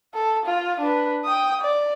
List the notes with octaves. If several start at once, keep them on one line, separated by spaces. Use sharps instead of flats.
A4
F4
D4 B4
G5 D#6
D5